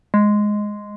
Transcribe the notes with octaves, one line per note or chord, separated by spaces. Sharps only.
G#3